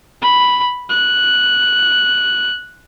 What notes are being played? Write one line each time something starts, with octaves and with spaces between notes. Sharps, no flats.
B5
F#6